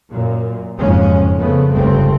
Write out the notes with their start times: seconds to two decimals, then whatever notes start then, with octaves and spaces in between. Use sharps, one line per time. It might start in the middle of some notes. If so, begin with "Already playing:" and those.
0.12 F#2 A#2
0.79 F#1 F2 G#2 G#3 C#4
1.39 C#3 F3 A3 B3
1.72 F1 C#2 G2 C#3 A3 C4